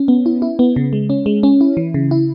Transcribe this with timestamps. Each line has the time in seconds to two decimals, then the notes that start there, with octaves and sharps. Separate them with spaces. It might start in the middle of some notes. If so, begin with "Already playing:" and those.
Already playing: C#4
0.08 B3
0.26 E4
0.42 E4
0.59 B3
0.76 C#3
0.93 G#3
1.10 C#4
1.26 G#3
1.43 C#4
1.61 E4
1.77 E3
1.94 C#3
2.11 E4